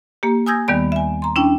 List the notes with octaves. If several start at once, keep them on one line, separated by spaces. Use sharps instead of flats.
A#3 G4
G#5 D#6 E6 G6 G#6 A#6
D#2 D#3 G3 B3 D5 B5
E5 G#5
A#5 C6
C#4 D4 E4 G5